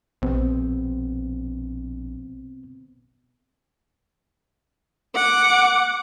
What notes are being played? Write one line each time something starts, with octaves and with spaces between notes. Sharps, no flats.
A#1 B2 B3 C4
F#5 D6